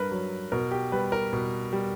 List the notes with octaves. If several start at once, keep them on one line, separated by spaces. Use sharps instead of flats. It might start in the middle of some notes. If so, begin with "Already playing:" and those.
Already playing: G2 A#4 B4
F#3
B2 A#4
G4
G3 B4
A#4
B2
G3